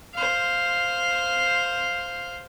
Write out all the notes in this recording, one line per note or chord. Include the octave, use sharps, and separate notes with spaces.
C5 F5